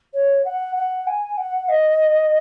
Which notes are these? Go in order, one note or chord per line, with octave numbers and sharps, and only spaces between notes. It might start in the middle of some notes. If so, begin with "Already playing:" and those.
C#5
F#5
F#5
G#5
F#5
D#5